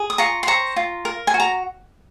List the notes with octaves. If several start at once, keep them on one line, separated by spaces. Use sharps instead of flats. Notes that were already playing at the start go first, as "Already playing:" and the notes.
Already playing: G#4
D#6
F4 A#5 C#6
C6
C5 A#5 C#6
F4
A#4
G#5
F#4
A#5